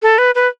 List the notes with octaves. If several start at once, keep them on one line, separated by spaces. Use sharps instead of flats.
A4
B4
B4